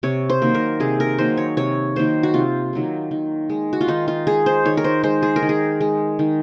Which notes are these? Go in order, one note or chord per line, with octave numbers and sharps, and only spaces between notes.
C3 C#5
C5
D#3 F#3 A#3
A#4
C3 G#4
A#4
D#3 F#3 A#3 C5
C#5
C3 C#5
D#3 F#3 A#3 C5
F#4
C3 F4
D#3 F#3 A#3
D#3
G#3
F#4
F4
D#3 D#4
F4
G#3 G#4
C5
D#3 C#5
A#4
C5
G#3 C5
G#4
A#4
D#3
G#4
G#3
D#3